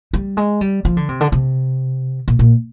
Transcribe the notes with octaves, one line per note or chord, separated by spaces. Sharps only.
G3
G#3
G3
F3
D3
C3
D3
C3
A#2
A#2